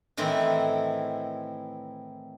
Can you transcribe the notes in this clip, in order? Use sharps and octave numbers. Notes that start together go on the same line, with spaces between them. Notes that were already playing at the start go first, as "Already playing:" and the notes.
A2 D#3 E3 C4